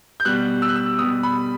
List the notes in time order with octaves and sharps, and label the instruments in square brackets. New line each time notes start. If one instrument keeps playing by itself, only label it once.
[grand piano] G6
B2 G3 B3 F#6
E6
F#6
E6
B2 G3 B3 D#6
B5